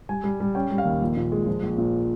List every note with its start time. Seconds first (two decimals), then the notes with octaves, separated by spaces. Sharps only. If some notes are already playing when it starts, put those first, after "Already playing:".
0.09 G3 G#5
0.24 G3
0.40 G3
0.55 C#4 G5
0.71 G3
0.78 F5
0.85 D#2
1.02 A#1
1.17 A#2
1.32 G#3
1.47 F3
1.63 A#1
1.78 A#2